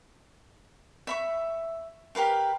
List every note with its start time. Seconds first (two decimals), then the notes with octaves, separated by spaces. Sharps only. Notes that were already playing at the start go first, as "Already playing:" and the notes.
1.07 E5 B5 C#6
2.15 G4 A#4 B4 F5